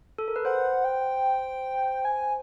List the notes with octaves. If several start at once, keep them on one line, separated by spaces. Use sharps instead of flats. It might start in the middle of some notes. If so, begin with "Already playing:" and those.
A4
A#4
B4
C5 F#5
G5
G#5